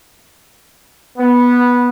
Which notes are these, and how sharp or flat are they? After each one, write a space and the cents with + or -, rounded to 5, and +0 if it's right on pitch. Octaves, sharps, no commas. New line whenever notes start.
B3 -10